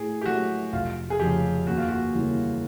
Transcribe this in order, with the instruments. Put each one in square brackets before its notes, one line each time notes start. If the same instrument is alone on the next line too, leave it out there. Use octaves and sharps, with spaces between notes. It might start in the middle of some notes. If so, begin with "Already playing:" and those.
Already playing: [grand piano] A2 [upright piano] G#4
[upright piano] G4
[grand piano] F#3 A3 [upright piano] F#4
[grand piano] F1 [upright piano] F4
[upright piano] G#4
[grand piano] F2 C#3 [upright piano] G4
[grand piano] D#2 [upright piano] F#4
[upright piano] F4
F#4
[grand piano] C#3 E3 G3 A#3